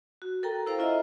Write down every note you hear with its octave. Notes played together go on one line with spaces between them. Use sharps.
F#4
A4 A#4 G5 A#5
E4 C5 F5 A#5
C#4 E4 F4 D#5 E5